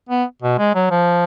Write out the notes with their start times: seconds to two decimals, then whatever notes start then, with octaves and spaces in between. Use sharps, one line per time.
0.09 B3
0.42 B2
0.58 G#3
0.75 F#3
0.91 F3